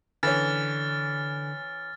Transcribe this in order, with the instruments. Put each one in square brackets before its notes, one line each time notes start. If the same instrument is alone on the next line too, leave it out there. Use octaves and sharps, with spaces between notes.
[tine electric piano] D3 [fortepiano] E3 C#4 [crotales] F6 A6